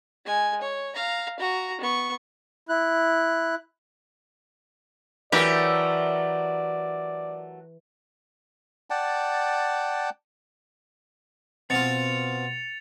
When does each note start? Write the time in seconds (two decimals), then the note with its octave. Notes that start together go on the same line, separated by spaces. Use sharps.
0.25 G#3 G#5
0.62 C#5
0.95 F5 A#5
1.40 F#4 A#5
1.81 B3 C#6
2.69 E4 F#6
5.32 E3 F#3 A3 G4 A#4 D5
8.90 D5 F#5 G5 A5
11.70 B2 C4 F4 A6 C#7 F7